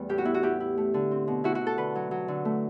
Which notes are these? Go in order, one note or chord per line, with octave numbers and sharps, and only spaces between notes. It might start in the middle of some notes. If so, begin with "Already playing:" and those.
Already playing: E2 G3 A3 B3
A2 G4
F#4
B3 E4
F#4
E4 G4
E4
A3
D3
C4
B2
E4 F#4
F#4
E4
A4
D3 B4
F#3
F#3
D3
A3